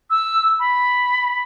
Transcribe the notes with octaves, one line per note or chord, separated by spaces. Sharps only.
E6
B5